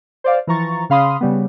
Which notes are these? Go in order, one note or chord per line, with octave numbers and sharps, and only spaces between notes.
C5 D5 F5
E3 F3 A#5 C#6 A6
C#3 C#4 F5 B5 C6 D#6
C#3 G3 B3